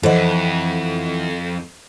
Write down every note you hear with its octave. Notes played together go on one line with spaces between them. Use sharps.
F2 G#2 E3 A4 C5 D#5 F#5